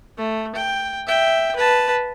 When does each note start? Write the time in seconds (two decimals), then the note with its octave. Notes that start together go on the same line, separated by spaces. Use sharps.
0.17 A3
0.55 G5
1.07 E5 G5
1.56 B4 A5